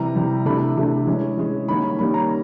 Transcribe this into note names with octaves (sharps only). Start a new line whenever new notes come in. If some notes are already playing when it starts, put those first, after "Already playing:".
Already playing: C3 E3 G3 A#5
C3 E3 G3
C3 E3 A3 D4 B5
C3 E3 A3 D4
E3 G#3 C#4
E3 G#3 C#4
D#3 G3 A#3 C#4 B5
B5
D#3 G3 A#3 C#4 B5
A#5